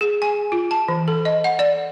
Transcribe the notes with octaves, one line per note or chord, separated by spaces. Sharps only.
G#4
G#5
F4
A5
E3
A4
D#5
F#5
D5